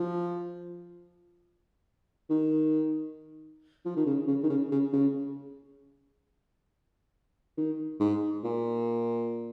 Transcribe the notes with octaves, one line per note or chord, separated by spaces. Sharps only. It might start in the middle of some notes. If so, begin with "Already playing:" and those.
Already playing: F3
D#3
F3
D#3
C#3
C#3
D#3
C#3
C#3
C#3
D#3
G#2
A#2